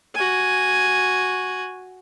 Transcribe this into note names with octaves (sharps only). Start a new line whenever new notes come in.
F#4 G#5